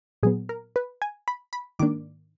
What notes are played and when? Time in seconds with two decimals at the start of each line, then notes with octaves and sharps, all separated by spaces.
0.23 A#2 F#3 B3 G#4
0.49 A#4
0.76 B4
1.02 G#5
1.28 B5
1.53 B5
1.79 G#2 D#3 A#3 D4 D6